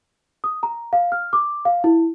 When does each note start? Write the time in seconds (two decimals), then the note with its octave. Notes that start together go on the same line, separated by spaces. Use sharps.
0.44 D#6
0.63 A#5
0.93 F5
1.12 F6
1.33 D6
1.65 F5
1.84 E4